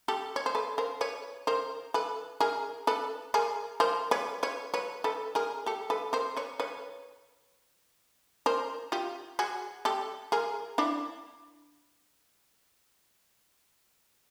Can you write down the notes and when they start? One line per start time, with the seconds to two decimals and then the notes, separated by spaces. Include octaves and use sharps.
0.08 G4 A4
0.36 C#5
0.46 C5
0.55 A4 B4
0.78 A#4 C5
1.01 B4 C#5
1.47 A#4 C5
1.94 A4 B4
2.40 G#4 A#4
2.87 A4 B4
3.34 G#4 A#4
3.80 A#4 C5
4.11 B4 C#5
4.43 B4 C#5
4.74 B4 C#5
5.04 A4 B4
5.35 G#4 A#4
5.66 G4 A4
5.90 A4 B4
6.13 A#4 C5
6.36 B4 C#5
6.60 B4 C#5
8.46 A#4 C5
8.92 F4 G4
9.39 F#4 G#4
9.85 G4 A4
10.32 G#4 A#4
10.78 D4 E4